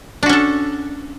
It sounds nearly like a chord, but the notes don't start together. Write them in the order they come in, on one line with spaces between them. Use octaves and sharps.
D4 F#4 C#4 A4